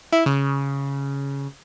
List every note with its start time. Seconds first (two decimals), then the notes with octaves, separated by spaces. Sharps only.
0.12 E4
0.26 C#3